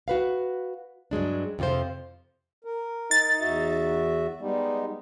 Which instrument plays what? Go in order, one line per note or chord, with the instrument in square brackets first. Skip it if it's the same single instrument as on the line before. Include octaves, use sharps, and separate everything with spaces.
[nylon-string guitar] F#4 B4 F5
G2 F#3 G#3 D4
F2 C3 F3 F4 C5
[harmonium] A#4
[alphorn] D#4 [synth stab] A6
[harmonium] E2 F#4 E5
[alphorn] G3 [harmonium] G#3 B3 D#4